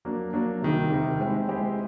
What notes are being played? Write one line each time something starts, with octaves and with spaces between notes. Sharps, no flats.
F#3 A#3 D4
F#3 A#3 D4
C3 D#3 G3
C3 D#3 G3
G#3 C4 E4 G4
G#3 C4 E4 G4